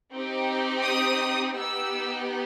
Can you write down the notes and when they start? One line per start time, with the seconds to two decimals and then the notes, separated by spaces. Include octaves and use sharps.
0.12 C4 D#4 G4
0.83 D#6
1.55 B3 D#4 G4 E6